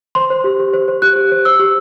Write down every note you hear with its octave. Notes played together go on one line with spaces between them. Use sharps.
C5 C6
C5
G4
G4
C5
C5
G4 F#6
G4
C5
C5 E6
G4